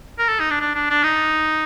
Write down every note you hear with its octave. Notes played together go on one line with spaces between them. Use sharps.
A#4
A4
D#4
D4
D4
D4
D4
D#4